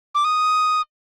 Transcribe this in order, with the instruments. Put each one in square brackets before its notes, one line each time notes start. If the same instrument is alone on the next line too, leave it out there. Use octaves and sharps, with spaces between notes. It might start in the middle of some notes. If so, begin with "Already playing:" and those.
[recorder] D6
D#6